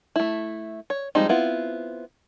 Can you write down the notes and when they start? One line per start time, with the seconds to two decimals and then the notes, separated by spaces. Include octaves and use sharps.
0.16 A3 E4
0.90 C#5
1.15 F3 G3 G#3 C4 D#4
1.29 B3 C4 E4 F4